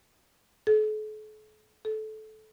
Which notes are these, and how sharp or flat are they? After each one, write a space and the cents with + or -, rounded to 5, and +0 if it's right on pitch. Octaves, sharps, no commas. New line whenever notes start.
A4 -45
A4 -20